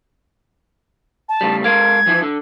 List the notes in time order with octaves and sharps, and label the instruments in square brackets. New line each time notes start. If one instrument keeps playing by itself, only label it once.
[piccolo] A5
[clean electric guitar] A2 C#3 G3
[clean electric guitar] G#3 A#4 F5 [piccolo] G#6
[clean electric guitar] E3 F3 E4
D3